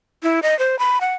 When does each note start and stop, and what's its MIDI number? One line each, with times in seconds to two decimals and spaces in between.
0.23 0.40 64
0.43 0.57 75
0.59 0.78 72
0.79 0.99 83
1.01 1.15 78